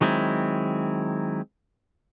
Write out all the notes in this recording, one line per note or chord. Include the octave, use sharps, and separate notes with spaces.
D#3 F#3 G#3 C4 E4